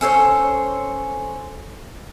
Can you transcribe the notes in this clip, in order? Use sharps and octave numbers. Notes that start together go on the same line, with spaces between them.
C#4 A4 C5 C#5